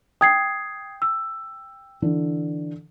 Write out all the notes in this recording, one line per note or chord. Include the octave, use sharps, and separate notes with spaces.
G5 D#6 G#6 C7
E6
D3 E3